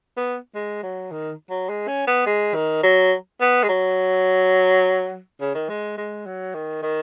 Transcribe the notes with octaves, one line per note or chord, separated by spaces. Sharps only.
B3
G#3
F#3
D#3
F#3
G#3
C#4
B3
G#3
D#3
F#3
B3
G#3
F#3
C#3
D#3
G#3
G#3
F#3
D#3
D#3